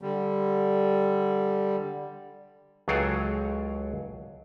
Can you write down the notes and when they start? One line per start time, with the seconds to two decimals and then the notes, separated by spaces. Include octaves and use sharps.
0.02 D3 G3
2.88 C#2 F#3 G#4 A4 F5 G5